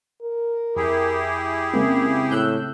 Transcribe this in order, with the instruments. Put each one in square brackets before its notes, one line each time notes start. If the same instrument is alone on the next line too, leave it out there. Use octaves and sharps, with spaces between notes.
[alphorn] A#4
[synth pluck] F2 [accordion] E4 G4 G#4
[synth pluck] C#3 G#3 C4 [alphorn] A#3
[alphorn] A2 [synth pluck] E6 F#6 G6